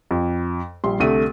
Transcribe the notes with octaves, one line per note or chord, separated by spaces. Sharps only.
F2
A#1 G3 C6
C2 D3 A3 D#7